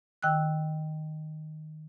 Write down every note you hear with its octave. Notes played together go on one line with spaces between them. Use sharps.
D#3 G5 E6 F#6